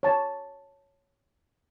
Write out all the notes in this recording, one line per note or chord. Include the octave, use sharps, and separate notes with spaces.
C#5 A5